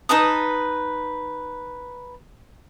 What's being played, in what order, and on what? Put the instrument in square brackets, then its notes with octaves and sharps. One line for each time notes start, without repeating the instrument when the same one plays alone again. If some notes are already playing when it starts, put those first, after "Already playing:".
[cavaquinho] D#4 B4 A5 D#6